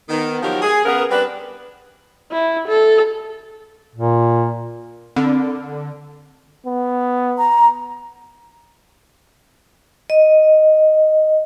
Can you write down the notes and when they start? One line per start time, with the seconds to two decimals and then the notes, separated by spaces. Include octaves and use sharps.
0.09 D#3 B3
0.42 D#3 F3 F#3 F#4 G4 A#4
0.62 G#4
0.85 C#3 B3 A#4
1.10 G3 C4 D4 B4
2.31 E4
2.69 A4
3.95 A#2
5.16 D3 C4
6.66 B3
7.38 A#5
10.10 D#5